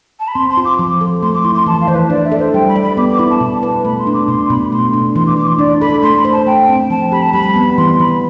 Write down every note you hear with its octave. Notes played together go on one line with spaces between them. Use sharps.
A5
B5
C4 C6
C6
F4
D6
F3
A4
A3 C6
D6
E4 C6
C6
E3 A5
F5
E3 C5
B4
D4 D5
E5
A4
C5
G3 G5
B5
D5
B5
B3 D6
D6
E4 B5
A5
B2
B4
A3 B5
C6
D4
D6
B2 C6
C6
B2 B5
A3 C6
D4
E3 C6
D6
E3 D6
C6
D4 D5
A4 B5
A3 C6
B5
C5
A5
A3 G5
C4
F3 A5
G4 B5
A5
G3 B5
B3
E3 C6
E3 B5